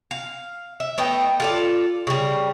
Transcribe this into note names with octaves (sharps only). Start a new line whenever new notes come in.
F5
E5
A3 B3 D#5 G5
F4 A4 D5
C#3 G3